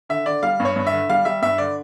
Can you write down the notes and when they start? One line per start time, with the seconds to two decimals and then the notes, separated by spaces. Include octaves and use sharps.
0.09 D3 E5
0.26 D3 D5
0.43 G3 F5
0.60 G2
0.65 C#5
0.76 G2
0.87 E5
0.92 D3
1.09 G3 F5
1.25 G3 E5
1.42 G2 E5
1.58 D3 D5